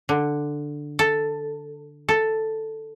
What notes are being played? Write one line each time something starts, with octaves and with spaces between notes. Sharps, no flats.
D3
A4
A4